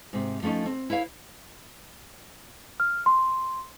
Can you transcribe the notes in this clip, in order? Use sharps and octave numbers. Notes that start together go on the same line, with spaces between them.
G#2 C3
F3 A3 C4 C#4 D#4
C4
E4 B4 C#5 F5
F6
C6